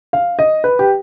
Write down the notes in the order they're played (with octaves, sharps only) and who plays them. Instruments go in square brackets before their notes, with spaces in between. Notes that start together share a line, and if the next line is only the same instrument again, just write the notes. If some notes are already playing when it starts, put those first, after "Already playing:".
[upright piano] F5
D#5
B4
G4